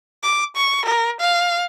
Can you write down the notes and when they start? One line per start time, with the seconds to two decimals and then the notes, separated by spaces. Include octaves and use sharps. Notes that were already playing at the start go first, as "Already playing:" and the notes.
0.23 D6
0.56 C#6
0.85 A#4
1.20 F5